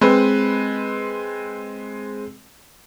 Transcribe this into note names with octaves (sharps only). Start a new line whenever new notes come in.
G#3 C4 B4